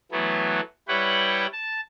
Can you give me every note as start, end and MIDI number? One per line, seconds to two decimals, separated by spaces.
0.12 0.60 52
0.12 0.60 54
0.12 0.60 57
0.12 0.60 59
0.88 1.47 55
0.88 1.47 64
0.88 1.47 71
0.88 1.47 73
0.88 1.47 78
0.88 1.47 79
1.53 1.80 81